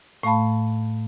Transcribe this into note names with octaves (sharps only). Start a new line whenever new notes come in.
A2 A3 F5 A5 B5